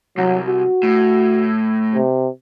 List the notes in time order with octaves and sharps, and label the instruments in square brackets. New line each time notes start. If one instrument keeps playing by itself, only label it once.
[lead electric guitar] C2 [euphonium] F#3
[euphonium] F#4
[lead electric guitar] A2
[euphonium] C3